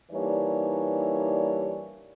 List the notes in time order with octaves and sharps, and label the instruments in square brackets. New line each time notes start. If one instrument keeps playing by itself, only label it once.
[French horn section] E3 G3 A#3 D4 D#4 C#5